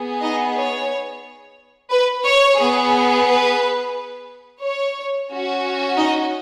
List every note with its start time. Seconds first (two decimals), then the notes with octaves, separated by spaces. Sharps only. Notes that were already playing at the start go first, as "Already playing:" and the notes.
Already playing: B3 G#4
0.21 D#4 D#5
0.55 C#5
1.91 B4
2.25 C#5
2.59 B3 G#4
3.27 B4
4.62 C#5
5.29 C#4 F#4
5.97 D#4 D#5